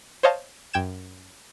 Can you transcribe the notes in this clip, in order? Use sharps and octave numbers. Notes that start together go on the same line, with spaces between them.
C5 C#5 D#5 F5 A5
F#2 G5 G#6 E7